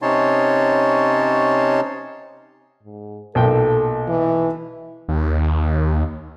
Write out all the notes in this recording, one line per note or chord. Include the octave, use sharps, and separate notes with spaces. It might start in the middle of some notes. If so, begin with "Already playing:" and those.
C3 C#4 D#4 C#5 A5 C6
G#2
B1 A#2 A4 G5
E3
D#2